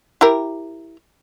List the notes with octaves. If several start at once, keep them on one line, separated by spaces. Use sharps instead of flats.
E4 G4 A#4